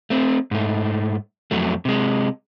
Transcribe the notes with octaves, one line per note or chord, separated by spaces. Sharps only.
A3 C4
G#2 A3
F2 F#3 A3
C3 G#3